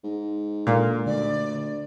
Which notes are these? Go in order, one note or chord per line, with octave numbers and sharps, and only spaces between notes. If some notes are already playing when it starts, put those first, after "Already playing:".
G#2
A#2 G#3 D4 A4
D2 D3 D5